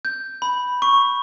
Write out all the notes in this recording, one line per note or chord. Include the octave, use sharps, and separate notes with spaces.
G6
B5
C#6